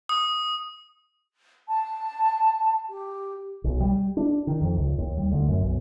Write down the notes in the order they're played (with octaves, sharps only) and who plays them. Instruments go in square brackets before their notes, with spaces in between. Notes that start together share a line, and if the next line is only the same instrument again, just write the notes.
[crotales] D#6
[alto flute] A5
G4
[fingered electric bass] B1
G3
D4
D#3
F2
C#2
D#2
G3
D2
F#2
B1